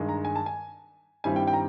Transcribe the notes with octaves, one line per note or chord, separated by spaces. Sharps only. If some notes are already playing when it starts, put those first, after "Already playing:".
Already playing: G2 D#3 G#3
A#5
G#5
A5
G#5
G2 D#3 G3 C4 E4 G#5
G5
G5
A#5